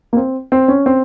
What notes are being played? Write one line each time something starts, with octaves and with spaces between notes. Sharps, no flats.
A#3
C4
C4
C#4
C4